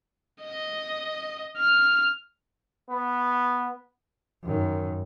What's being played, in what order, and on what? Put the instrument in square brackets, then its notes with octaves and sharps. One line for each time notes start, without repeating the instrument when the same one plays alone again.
[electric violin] D#5
F6
[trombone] B3
[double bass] F#2 D#3